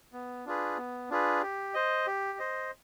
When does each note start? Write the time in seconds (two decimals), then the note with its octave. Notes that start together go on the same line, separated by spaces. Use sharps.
0.13 B3
0.45 D4 F4 G#4 B4
0.77 B3
1.10 D4 F4 G#4 B4
1.42 G4
1.74 C5 D#5
2.07 G4
2.39 C5 D#5